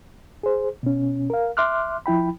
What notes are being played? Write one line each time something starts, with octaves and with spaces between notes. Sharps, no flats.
G#4 C5
B2 C#4
A#4 F5
E5 C6 D6 F6 F#6
F3 E4 G5 B5